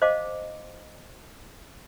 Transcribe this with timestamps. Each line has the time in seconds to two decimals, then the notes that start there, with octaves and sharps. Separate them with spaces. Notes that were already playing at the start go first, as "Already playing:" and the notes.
0.02 C5 D#5 F5 A5 D6